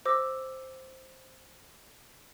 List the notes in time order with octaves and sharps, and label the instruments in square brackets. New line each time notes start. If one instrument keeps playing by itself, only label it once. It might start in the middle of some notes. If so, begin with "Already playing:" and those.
[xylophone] C5 D6 E6 A#6